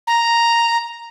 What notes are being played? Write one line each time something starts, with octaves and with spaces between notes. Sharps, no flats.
A#5